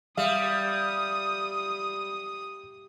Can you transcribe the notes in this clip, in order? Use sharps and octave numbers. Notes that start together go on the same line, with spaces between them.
G3 E5 F5 D#6